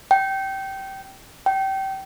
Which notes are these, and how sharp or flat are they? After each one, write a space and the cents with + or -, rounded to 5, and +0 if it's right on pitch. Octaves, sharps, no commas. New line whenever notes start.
G5 -20
G5 -25